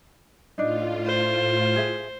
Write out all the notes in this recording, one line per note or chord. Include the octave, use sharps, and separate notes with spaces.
A2 D4 D#4 F4
C5
G#4 E5